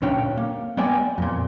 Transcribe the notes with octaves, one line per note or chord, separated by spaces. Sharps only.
D2 A#2 C#4 D4 G5
A#3
G#3 B3 D5 G5 G#5
F2 A#2